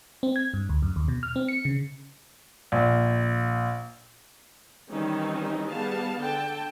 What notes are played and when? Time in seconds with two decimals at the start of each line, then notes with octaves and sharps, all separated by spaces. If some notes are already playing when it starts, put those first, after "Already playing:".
0.23 C4
0.36 G#6
0.54 G2
0.69 D2
0.82 F#2
0.96 D#2
1.08 B2
1.23 F6
1.36 C4
1.48 C#7
1.65 C#3
2.72 A#1
4.90 D#3 E3 G3 C4 C#4 D#4
5.70 G3 B3 G#4 F5 A5
6.20 D3 G5 A5